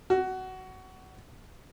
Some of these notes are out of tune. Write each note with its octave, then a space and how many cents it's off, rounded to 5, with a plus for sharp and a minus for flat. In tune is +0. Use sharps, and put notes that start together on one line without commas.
F#4 +15